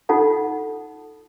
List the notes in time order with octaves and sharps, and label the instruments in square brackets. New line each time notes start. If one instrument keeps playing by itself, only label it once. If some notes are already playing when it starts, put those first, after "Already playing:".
[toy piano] D#4 F4 A4 F#5 A5